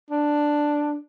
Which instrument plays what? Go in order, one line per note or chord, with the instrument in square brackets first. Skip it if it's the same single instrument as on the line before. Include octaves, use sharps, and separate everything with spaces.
[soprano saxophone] D4